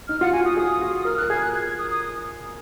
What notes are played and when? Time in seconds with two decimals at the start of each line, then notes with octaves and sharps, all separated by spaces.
0.08 D#4 F6
0.21 F4 F#5
0.33 F#4 G#5
0.45 F#4 D#6
0.57 G#4 D#6
0.81 F#4
1.01 D#6
1.05 A#4 F6
1.18 F#6
1.22 A#4
1.30 G#4 G#6
1.41 F#6
1.54 G#6
1.66 G#6
1.79 D#6
1.90 D#6